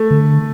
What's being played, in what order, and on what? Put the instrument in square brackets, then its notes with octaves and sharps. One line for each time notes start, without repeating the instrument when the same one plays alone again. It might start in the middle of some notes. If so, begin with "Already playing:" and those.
Already playing: [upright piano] A3
[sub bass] D3